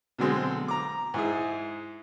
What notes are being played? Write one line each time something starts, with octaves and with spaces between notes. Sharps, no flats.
B2 D3 F#3 G#3 C4
A#5 D6
G#2 E4 G#4